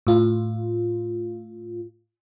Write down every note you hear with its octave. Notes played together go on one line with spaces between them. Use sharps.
A2 F4